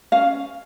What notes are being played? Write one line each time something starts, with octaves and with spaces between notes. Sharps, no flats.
C#4 F5